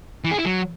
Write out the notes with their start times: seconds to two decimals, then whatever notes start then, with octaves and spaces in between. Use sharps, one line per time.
0.24 E3
0.31 G#4
0.38 E4
0.45 F#3